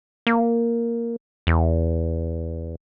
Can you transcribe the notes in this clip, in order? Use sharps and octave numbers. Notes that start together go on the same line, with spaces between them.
A#3
E2